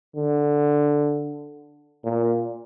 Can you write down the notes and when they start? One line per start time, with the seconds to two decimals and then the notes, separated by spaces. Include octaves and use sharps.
0.16 D3
2.05 A#2